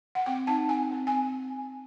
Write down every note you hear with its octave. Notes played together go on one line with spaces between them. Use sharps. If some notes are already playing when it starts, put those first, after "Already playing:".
F#5
C4 G5
D#4 A5
C4 G#5
C4
G#5